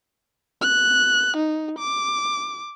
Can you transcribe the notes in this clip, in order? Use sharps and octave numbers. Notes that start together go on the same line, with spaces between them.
F#6
D#4
D6